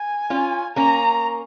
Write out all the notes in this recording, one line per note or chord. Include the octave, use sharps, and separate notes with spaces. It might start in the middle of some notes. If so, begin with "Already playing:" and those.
Already playing: G#5
C#4 F4
A#3 C#4 A#5